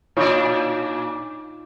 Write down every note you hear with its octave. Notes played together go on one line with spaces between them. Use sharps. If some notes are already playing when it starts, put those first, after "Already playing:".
A#2 D4 D#4 F4 C#5